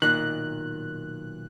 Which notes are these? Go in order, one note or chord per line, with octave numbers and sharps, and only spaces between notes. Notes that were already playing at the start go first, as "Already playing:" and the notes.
B1 A#2 D#3 F#6